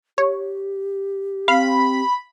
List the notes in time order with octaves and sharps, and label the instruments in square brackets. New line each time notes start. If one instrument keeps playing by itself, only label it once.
[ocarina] G4 [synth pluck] C#5
[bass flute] C4 [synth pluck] F5 [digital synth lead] B5